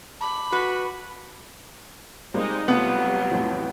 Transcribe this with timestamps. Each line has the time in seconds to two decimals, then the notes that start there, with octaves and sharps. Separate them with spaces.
0.21 A5 B5 D6 F#7
0.52 F#4 B4
2.34 G3 G#3 A#3 C4 D#4
2.68 C3 F#3 G3 A3 B3 F4 F#7
3.31 A1 F2 A2